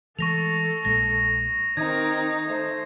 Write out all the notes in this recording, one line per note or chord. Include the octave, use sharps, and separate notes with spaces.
E3 G#3 A3 A4 C#6 A#6 F7
A#1 G#3 A#3 A#6
D#3 C4 D#4 A#4 G#6
A3 C5